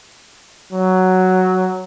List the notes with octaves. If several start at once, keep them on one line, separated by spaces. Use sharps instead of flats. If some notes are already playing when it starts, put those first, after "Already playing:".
F#3